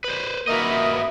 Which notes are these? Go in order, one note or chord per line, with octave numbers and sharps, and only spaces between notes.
B4 C5
A#3 F#4 A#4 B4 D#5 E5 D#6